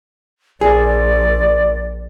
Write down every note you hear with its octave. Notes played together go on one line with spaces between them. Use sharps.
A#1 G#4 D5